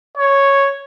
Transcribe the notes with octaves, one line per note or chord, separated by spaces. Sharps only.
C#5